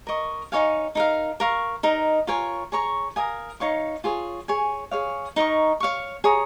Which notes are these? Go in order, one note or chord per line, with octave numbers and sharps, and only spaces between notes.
A#4 D#5 C#6
D#4 C#5 F5 G#5
D#4 A#4 F5
A#4 F5 C#6
D#4 A#4 D#5
F4 A#4 C#5 G#5
G#4 C#5 A#5 C#6
A#4 F5 G#5 D#6
D#4 C#5 F5 C#6
F4 G#4 C#5
G#4 C#5 G#5
G#4 C#5 F5
D#4 A#4 D#5 C#6
C#5 F5 C#6
G#4 C#5 A#5 D#6